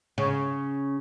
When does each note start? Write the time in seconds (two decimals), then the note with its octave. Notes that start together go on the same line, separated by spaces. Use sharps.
0.18 C#3